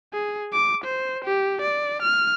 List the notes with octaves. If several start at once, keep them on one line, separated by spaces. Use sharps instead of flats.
G#4
D6
C5
G4
D5
F6